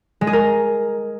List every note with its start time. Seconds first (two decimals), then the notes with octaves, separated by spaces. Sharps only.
0.21 G#3
0.27 G#4
0.33 A#4